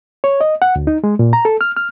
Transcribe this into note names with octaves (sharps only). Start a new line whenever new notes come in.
C#5
D#5
F#5
D2
D#4
G#3
A#2
A#5
A4
F6
F6